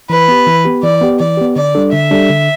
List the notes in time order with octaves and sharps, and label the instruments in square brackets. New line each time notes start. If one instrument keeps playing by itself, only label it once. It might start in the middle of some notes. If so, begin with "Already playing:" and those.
[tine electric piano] E3 [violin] B4
[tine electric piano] B3 G4
E3
B3 G4
[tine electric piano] E3 [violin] D5
[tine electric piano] B3 G4
[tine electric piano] E3 [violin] D5
[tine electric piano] B3 G4
[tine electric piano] D3 [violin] D5
[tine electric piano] G3 D4 A4
[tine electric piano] D3 [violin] E5
[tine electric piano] G3 D4 A4
D3